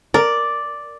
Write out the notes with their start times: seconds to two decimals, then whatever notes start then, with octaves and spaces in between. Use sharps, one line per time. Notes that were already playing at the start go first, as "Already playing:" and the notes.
0.14 A#4 D5